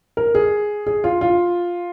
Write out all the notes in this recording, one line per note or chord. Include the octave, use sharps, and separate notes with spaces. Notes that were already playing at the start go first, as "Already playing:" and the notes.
A#4
G#4
G#4
F4
F4